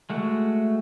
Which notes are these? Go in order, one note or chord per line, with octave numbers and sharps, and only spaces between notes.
G#3 A3 F#4